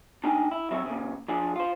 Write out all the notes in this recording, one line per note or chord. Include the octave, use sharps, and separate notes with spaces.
D4 D#4 G5 G#5
E4
F#3 C4 E5
A#2 C#3
F3 D4 G#4
F4 C5